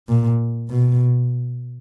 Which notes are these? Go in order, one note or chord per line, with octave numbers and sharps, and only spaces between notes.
A#2
B2